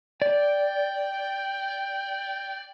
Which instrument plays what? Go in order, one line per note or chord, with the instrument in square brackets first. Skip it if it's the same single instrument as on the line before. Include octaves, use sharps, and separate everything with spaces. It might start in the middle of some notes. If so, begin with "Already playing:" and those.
[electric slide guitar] D5 [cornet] G5